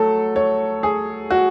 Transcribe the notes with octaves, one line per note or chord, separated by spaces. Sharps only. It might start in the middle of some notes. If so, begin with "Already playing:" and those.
Already playing: F#3 A3 A4
C#5
G#4
F#4